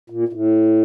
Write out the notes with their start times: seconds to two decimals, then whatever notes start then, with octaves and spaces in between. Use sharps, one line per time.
0.10 A#2
0.28 A#2
0.33 A2